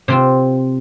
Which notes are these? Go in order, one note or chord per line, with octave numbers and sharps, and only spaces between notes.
C3 C4 F4